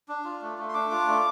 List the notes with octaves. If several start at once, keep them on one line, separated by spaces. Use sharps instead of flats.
D4
F4
A3
A3
C6
D4 D6
F4
A3